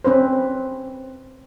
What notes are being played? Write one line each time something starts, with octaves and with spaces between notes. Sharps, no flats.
C4 C#4 B4 C5